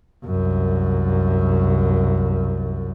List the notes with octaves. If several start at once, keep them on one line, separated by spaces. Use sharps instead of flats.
C2 F#2